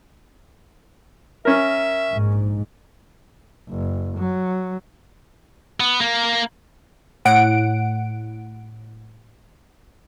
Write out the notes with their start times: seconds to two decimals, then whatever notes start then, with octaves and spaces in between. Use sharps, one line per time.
1.45 C#4 A#4 E5
2.11 A#1 G#2
3.69 F#1
4.17 F#3
5.80 B3
6.00 A#3
7.25 A2 F#5 D7